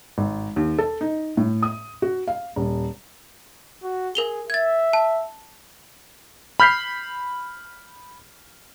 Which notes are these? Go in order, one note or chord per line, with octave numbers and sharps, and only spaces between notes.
G#1
D#2
A4
D#4
A2
D#6
F#4
F5
D#1
F#4
G#4 A#4 F7 G7
E5 G#6 A6
A5
B5 F6 G6 B6 C7